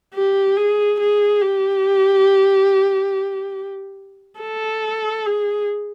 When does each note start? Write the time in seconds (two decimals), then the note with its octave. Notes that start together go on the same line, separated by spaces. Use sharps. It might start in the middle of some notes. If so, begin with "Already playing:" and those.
0.14 G4
0.57 G#4
1.00 G#4
1.42 G4
4.40 A4
5.26 G#4